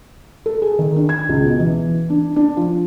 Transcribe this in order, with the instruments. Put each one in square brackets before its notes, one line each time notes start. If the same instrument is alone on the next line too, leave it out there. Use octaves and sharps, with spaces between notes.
[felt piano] A4
G#4
D#3
D4
G#6
C#2
B2
E3
D4
D4
F3